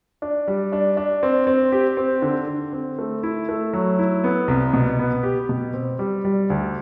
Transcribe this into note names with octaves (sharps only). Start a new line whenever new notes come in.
D4
G3
D4
D4
C4
C4
G4
C4
D3
D3
C4
A3
E4
A3
F#3
E4
B3
C2
B2
B3
G4
B2
C4
G3
G3
D2